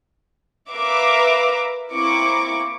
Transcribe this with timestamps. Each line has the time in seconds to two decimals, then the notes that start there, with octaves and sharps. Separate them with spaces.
0.70 A#4 B4 E5 F5 D6
1.92 A#3 C4 E4 C#6 D6